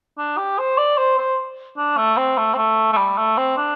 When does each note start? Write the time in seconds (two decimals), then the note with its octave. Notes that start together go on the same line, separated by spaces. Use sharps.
0.18 D4
0.38 G4
0.59 C5
0.78 D5
0.98 C5
1.18 C5
1.77 D4
1.97 A3
2.17 C4
2.38 A3
2.54 C4
2.57 A3
2.93 A3
2.97 G3
3.18 A3
3.37 C4
3.57 D4